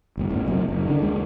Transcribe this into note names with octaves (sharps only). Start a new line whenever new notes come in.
G1 D#2
A1 E2
F#1 F#2 C3
F#1
D3 D#3
D#2 G#3